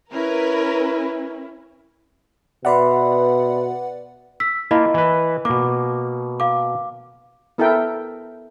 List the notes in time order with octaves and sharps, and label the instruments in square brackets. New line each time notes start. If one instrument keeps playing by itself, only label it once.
[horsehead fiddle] C#4 E4 [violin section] A#4 B4
[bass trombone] B2 [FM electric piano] B4 D5 F#5 [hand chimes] E5 B5 C6
[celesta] E6 B6
[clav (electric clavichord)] A#3 F4 [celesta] E4 D#5 B5
[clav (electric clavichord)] E3 B4
[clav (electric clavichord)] B2 A#3 [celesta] D6
[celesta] F5 D6
[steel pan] B3 E4 A4 A#4 E5 G5